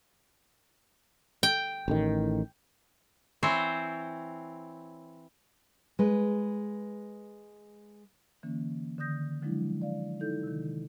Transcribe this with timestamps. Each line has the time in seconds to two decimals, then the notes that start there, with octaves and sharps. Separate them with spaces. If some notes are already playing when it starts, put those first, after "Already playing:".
1.43 G5
1.88 A1 A2 D#3
3.43 E3 C4 C5 C#5
5.99 G#3 B4
8.43 D3 E3 A#3 C#4
8.98 D3 D#3 D#6 G6 A#6
9.42 D3 F3 F#3 G#3 D4 E4
9.82 D5 F5
10.20 D#4 E4 A4 G6
10.43 C3 D#3